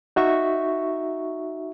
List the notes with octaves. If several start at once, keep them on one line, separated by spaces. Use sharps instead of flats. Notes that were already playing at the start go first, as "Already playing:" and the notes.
D#4 F#4 E5 C#6